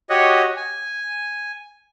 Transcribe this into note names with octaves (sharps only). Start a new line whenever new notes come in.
F#4 G4 C#5 D#5 F#5
G#5